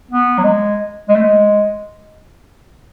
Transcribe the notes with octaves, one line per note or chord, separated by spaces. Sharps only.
B3
F#3
G#3
G#3
A3
G#3